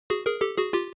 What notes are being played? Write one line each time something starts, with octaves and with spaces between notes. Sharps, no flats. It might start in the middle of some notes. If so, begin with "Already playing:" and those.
F#4 G#4
G#4 A#4
G4 A4
F#4 G#4
F4 G4